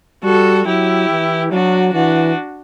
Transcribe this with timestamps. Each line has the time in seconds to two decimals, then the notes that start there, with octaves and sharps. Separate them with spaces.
0.24 G3 F#4 A4
0.66 F#3 E4 G4
1.09 E3
1.52 F#3 D4 F#4
1.94 E3 D4 F#4